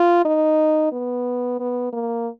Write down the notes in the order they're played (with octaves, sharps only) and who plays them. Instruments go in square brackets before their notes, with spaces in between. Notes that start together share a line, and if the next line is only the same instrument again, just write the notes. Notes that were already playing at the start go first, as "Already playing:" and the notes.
Already playing: [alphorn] F4
D#4
B3
B3
A#3